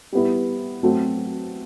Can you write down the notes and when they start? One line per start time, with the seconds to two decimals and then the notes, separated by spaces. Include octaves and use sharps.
0.12 G3 B3 E4
0.83 F#3 A3 C4 F#4